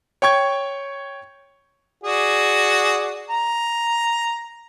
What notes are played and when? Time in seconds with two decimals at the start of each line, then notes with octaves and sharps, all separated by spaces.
0.22 C#5 G5 C#6 G#6
2.04 F#4 G#4 D5
3.30 A#5